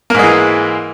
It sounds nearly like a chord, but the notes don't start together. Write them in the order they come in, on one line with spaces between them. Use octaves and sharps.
A#3 G#2 G#3 E3